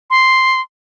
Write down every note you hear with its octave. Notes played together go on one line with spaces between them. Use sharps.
C6